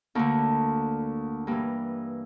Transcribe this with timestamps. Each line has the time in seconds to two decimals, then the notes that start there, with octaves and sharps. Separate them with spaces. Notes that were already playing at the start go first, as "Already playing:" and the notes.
0.15 D2 D3 A#3
1.47 G2 E3 A#3